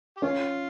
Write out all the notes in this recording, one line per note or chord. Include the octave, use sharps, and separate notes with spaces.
G4
C#4 F4